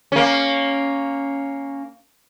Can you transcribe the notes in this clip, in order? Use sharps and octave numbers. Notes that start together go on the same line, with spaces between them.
A#3 C#4